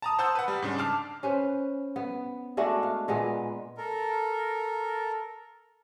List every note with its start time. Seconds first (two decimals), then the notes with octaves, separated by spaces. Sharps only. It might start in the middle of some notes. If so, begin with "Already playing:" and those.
0.02 A5 A#5 D#6
0.19 C5 F#5 A5 D#6 E6 G6
0.35 B4 F#5
0.48 G3
0.62 G#2 C#3 D4
0.78 A5 D6 F6 C7
1.23 C#4 B4 C5
1.96 B3
2.57 G#3 A3 D4 F#4
2.83 F5
3.08 A#2 G#3 B3
3.77 A4 A#4